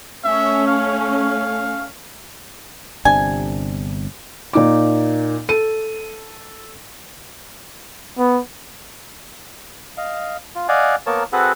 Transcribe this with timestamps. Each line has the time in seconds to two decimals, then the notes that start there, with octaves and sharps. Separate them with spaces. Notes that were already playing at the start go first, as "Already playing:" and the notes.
0.25 A3 C#4 E5
0.68 F5
3.05 G1 C3 D4 G#5
4.53 A#2 D#4 D6
5.49 A4 D#7
8.18 B3
9.97 D#5 F5
10.55 F4
10.68 D5 D#5 F5 F#5 G#5
11.06 A#3 B3 A#4 C#5 A5
11.33 C4 F#4 G#4 A4 B4 F#5